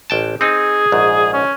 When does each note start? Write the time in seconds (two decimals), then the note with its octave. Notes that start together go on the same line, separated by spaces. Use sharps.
0.10 A1 G5 A5
0.41 C4 D#4 G#4
0.92 A#1 G#2
1.33 C#4